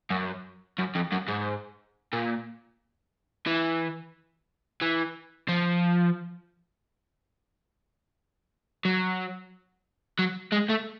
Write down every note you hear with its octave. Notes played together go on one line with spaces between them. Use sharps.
F#2
F#2
F2
F#2
G#2
A#2
E3
E3
F3
F#3
F#3
G#3
A3